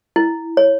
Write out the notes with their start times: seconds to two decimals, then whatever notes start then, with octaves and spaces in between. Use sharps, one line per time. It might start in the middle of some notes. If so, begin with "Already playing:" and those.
0.16 E4
0.57 C#5